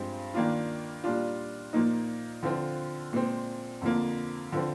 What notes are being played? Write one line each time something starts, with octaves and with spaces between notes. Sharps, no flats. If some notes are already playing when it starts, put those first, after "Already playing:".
Already playing: G2 F3 G#3 C4
D#3 A#3 D4 F4
A#2 G3 D4 F4
A#2 F3 A#3 D#4
D3 F3 C4 F4
A#2 G#3 C4
F2 D3 F3 A#3
D3 F3 C4